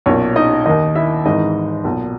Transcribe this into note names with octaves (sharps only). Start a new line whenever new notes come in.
B1 A#2 C#4 C#5
D#4 D#5
D#2 D#3 D#4 D#5
E4 E5
G#1 G#2 E3 D#4 D#5
B1 A#2